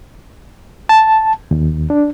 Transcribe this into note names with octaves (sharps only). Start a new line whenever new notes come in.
A5
D#2
D4